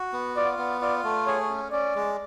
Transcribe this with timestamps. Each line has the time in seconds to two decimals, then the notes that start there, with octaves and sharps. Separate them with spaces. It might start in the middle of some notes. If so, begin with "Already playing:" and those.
Already playing: F#4
0.13 B3
0.36 F4 D5
0.58 B3
0.81 F4 D5
1.04 A3
1.26 G#4 C#5
1.49 C#4
1.72 C#4 D5
1.95 G#3